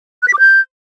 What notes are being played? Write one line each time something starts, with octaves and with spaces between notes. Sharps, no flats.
F#6
B6
D6
G6